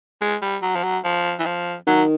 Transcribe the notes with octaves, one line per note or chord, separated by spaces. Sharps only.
G#3
G3
F#3
F3
F#3
F3
E3
F3
D#3 F#3